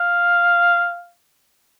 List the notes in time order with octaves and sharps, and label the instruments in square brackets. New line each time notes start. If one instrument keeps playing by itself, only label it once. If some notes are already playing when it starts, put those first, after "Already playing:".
Already playing: [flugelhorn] F5